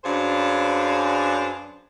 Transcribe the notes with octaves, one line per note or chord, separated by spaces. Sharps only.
F#2 D4 G#4 B4 C5 F5